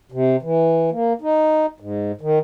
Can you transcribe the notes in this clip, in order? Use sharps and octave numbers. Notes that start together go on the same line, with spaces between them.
C3
E3
A#3
D#4
G#2
D#3